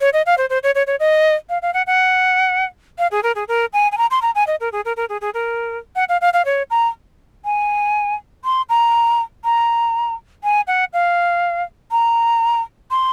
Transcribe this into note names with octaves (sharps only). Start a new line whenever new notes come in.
C#5
D#5
F5
C5
C5
C#5
C#5
C#5
D#5
F5
F5
F#5
F#5
F5
G#4
A#4
G#4
A#4
G#5
G#5
A#5
C6
A#5
G#5
D#5
A#4
G#4
A#4
A#4
G#4
G#4
A#4
F#5
F5
F5
F5
C#5
A#5
G#5
C6
A#5
A#5
G#5
F#5
F5
A#5
C6